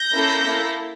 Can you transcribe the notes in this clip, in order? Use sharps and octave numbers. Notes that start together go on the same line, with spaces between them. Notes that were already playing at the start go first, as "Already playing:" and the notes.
Already playing: G6 A#6
A#3 C#4 E4 A4
A#3 E4 A4